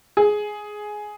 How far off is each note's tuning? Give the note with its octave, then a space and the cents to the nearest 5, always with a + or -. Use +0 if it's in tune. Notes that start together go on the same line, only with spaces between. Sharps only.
G#4 +10